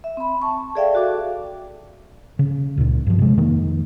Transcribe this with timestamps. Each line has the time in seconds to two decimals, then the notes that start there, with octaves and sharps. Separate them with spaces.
0.04 E5
0.17 C4 B5
0.42 A5 C#6
0.75 G#4 A4 D5 E5 F5 G5
0.95 F#4 A4 D6
2.39 C#3
2.78 C#2 A#2
3.07 G2 F3
3.18 C3 G#3
3.38 F2 D#3 A#3